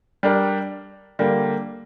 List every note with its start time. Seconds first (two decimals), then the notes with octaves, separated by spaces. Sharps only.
0.23 G3 D4 A#4
1.19 D3 G3 A#3